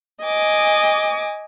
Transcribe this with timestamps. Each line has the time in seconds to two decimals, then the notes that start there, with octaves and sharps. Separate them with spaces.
0.25 D#5 G#5 D6